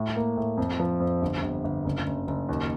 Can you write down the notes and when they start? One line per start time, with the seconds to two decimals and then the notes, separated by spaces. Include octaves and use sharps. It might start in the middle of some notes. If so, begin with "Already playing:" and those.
Already playing: A2
0.16 A#3
0.37 A2
0.57 F2
0.80 F3
1.00 F2
1.22 G1
1.42 G1
1.64 G1
1.84 F#1
2.06 F#1
2.28 F#1
2.49 D#2